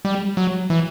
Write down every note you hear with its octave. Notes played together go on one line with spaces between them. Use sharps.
G3
F#3
E3